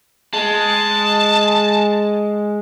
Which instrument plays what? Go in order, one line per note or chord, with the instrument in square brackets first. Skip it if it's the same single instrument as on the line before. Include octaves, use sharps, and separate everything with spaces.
[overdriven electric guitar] G#3 [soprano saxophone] A5